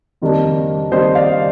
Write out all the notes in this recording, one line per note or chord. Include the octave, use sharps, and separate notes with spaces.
F2 D#3 G3 A#3 D4
F2 D#3 G3 A#3 D4 C5 D#5
D5 F5